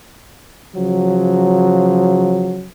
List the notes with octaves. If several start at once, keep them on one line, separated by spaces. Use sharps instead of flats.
C#3 F3 F#3